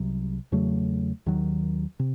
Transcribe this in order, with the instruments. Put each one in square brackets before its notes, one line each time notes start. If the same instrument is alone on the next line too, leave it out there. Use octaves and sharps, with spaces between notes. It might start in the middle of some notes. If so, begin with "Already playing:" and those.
Already playing: [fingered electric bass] C2 C3 F#3
E2 C#3 F#3 A3
D#2 D#3 F#3
C3